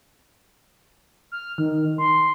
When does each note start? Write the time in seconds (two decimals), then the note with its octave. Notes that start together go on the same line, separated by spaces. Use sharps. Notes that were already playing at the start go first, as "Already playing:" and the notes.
1.32 F6
1.58 D#3
1.98 C6